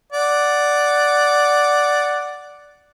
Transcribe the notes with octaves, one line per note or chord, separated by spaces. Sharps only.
D5 F#5